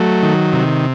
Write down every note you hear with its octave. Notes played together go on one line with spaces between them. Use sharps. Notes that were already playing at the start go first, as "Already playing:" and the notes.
Already playing: F#3 A3
D#3
C3